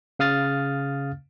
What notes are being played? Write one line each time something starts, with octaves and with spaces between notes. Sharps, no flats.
C#3 F5 D#6 F6 A6